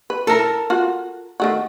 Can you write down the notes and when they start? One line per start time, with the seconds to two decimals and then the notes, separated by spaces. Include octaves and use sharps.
0.10 B4
0.27 E4 A4 A#4
0.70 F4 F#4
1.40 D#3 A3 F#4